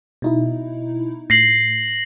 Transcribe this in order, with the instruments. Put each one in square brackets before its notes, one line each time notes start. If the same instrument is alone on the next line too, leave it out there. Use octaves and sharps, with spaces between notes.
[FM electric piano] B2 D#4 E4
[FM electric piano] A2 [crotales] A#6 C7 F#7